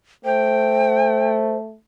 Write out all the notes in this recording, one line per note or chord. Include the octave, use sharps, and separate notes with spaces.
A3 C5 G5